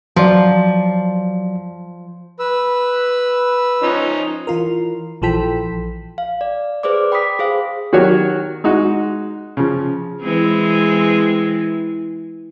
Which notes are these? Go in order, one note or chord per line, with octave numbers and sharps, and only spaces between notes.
F3 F#3 D5
B4 E6
F3 C#4 D#4
E3 F4 A#4
A#1 E3 F3 A4 G5 B6
F5
D5
G#4 B4 C5 D5 D6
G5 B5 D6 D#6 B6
G#4 C5 F5
D#3 F#3 F#4 G4 C#5
G#3 D#4 F#4
C#3 F3
E3 G#3 C4